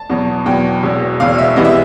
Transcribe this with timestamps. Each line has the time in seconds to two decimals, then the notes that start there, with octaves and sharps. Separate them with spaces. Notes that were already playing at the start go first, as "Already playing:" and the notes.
Already playing: A5
0.10 E2 B2 F#3
0.46 E2 B2 F#3 G5
0.83 E1 E2 B2
1.20 E1 E2 B2 F5
1.38 E5
1.56 C2 C3 E3 G#3 B3 D#5
1.65 E5